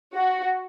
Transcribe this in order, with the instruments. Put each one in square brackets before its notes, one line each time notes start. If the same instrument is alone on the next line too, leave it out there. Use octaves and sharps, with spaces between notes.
[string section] F#4